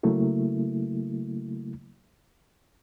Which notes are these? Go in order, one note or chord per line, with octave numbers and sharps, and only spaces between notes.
C#3 F#3 A3 A#3 E4